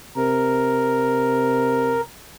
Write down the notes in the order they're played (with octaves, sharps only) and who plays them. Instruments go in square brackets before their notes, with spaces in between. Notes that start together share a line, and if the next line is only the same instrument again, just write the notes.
[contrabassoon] C3 [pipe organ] A#4